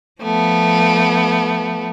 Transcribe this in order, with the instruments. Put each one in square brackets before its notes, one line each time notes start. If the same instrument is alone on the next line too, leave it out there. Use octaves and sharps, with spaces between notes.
[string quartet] F3 A3 B3